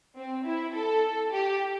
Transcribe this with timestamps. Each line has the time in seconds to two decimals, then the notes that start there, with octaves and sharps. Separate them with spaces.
0.17 C4
0.45 E4
0.74 A4
1.33 G4